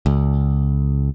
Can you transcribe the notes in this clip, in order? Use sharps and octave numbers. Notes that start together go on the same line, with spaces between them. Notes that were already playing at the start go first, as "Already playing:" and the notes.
C#2